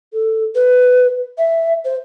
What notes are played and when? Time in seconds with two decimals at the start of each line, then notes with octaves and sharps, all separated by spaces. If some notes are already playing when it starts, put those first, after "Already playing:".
0.13 A4
0.55 B4
1.38 E5
1.85 C5